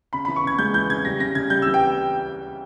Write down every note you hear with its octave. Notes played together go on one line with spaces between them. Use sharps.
C#3 B5
E3 B5
C#6
C#3 G#6
G#3 G6
E3 G6
C#3 G#6
G3 A#6
C#3 A#6
C#3 G#6
G3 G6
E3 E6
G5